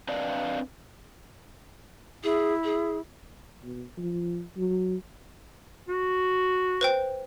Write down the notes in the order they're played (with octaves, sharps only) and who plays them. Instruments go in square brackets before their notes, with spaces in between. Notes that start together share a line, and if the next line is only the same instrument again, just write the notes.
[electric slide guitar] C4 D4 B4 D5 D#5 F5
[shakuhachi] E4 [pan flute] G#4
[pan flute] G#4
[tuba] B2
F3
F#3
[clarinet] F#4
[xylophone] B4 C5 G5